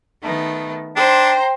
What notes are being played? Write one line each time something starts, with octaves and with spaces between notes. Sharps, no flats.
D#3 A3 B3
D4 C5 G5 A#5 C6